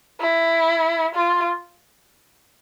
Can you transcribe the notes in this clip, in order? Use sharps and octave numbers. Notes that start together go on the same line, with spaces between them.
E4
F4